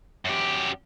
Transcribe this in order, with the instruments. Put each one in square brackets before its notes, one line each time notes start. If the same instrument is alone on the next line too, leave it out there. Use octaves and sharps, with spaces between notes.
[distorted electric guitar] F#2 G4